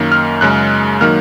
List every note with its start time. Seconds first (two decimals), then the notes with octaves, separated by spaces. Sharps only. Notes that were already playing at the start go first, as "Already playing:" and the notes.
Already playing: F#2 D#3 A#3
0.12 F6
0.41 F#2 C#3 G#3 F#6
1.01 D#3 F#3 A#3 F6